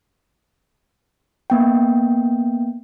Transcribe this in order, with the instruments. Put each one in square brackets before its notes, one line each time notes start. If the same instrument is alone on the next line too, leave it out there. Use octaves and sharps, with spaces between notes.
[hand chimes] A#3 B3 G5